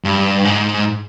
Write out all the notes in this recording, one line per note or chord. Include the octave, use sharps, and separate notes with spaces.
G2
G#2